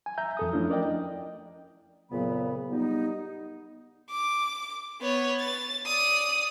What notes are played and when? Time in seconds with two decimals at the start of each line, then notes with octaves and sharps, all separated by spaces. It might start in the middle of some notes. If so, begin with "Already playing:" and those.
0.06 G#5
0.18 E5 A#5 G6
0.37 F2 A4 D#6
0.53 F3 A3 C#4 D4 E4
0.70 A#4 D5 D#5 G5
2.10 F2 A#2 C#3 F#3 B3 B5
2.70 G3 B3 D#4
4.10 D6
5.01 B3 C#5
5.40 A6
5.86 D5 D#6